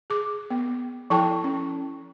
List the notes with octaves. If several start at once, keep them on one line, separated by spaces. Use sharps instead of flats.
G#4 D6
B3
F3 E4 A4 G5 A5 C#6
C#4